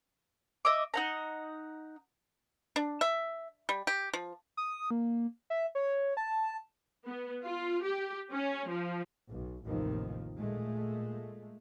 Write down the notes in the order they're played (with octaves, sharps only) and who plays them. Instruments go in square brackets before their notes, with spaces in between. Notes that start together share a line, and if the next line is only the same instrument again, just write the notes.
[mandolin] D#5 E5 D6
D#4 F#5 A#5
[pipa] D4
E5
G3
G4
F3
[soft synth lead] D#6
A#3
E5
C#5
A5
[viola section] B3
F4
G4
C#4
F3
[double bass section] B1
A1 D#2 C3 D#3 F3
A#2 G#3 A3